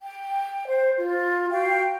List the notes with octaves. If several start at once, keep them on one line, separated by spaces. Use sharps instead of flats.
G5
C5
F4
F#4 F5 G5